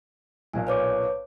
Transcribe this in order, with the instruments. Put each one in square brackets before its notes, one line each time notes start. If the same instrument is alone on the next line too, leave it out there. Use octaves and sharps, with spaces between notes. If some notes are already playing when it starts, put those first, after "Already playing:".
[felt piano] B1 A#2 [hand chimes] G#5
[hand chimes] B4 C#5 D6